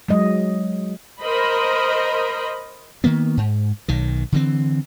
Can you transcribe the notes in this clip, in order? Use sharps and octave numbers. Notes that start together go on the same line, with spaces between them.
F#3 G#3 D#5
A#4 C5 D#5 B5
D#3 A#3 B3
G#2
B1 D#3
D3 E3 C4